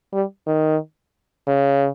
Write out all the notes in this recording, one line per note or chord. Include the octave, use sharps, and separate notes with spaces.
G3
D#3
C#3